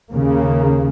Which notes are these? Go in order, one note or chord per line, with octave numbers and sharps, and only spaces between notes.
D#2 C#3 A#3